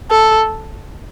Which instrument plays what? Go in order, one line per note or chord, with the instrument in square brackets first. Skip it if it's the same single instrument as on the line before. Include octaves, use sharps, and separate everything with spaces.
[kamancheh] A4